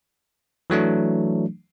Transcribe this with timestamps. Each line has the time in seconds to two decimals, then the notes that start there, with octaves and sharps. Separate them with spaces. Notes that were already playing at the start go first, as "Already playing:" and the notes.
0.70 E3 F#3 A3 D4